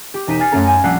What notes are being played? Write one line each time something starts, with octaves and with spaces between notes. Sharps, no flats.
G4
E1 D#4 B6 D#7 E7
G#5 F6 A6 C7 C#7
F#2 A3 C#4 A4 A#5
F5 G#5
A#1 G3 F#5 A5 E6 C7